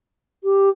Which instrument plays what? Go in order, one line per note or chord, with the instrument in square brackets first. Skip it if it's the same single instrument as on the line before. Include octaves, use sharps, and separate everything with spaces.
[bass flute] G4